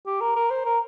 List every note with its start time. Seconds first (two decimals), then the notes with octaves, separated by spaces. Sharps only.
0.06 G4
0.21 A#4
0.36 A#4
0.50 C5
0.65 A#4